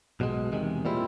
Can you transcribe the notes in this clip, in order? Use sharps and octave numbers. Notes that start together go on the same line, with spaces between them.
B1 B2 G#3
E2 C3 D#3 G#3
A#2 G3 C4 E4